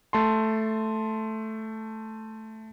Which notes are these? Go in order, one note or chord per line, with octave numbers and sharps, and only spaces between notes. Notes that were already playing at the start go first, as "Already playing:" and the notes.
A3 A5 C6